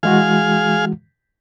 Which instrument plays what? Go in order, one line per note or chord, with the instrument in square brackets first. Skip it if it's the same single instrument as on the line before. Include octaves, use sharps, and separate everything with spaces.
[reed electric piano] E3 G#3 F#4 [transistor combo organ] G#4 F5